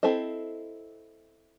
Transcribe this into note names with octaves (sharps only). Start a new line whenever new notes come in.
C4 E4 A4 C5 D#5